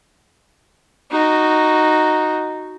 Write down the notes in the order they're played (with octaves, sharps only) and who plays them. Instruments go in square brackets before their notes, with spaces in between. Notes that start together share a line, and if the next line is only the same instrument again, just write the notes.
[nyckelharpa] D#4 F#4